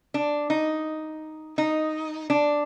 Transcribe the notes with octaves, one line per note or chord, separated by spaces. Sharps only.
D4
D#4
D#4
D4